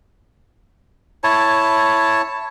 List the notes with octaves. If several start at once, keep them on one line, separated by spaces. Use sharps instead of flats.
E4 C#5 A5